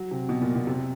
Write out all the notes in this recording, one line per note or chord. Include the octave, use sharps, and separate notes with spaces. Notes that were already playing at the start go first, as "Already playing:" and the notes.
Already playing: F#3
C3
B2
A#2
B2
C3